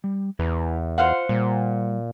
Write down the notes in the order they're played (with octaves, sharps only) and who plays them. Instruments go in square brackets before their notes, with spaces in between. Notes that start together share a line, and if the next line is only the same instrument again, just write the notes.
[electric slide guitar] G3
[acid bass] E2 [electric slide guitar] E4 B4 A#5
[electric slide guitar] F4 [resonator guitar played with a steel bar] C5 F5 F#5
[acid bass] A#2 [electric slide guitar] G3